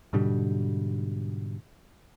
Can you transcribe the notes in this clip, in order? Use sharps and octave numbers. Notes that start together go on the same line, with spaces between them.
G#2 B2 D3 G3